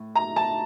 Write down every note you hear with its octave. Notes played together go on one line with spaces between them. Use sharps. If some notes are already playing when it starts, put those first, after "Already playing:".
Already playing: A2
A#5
A5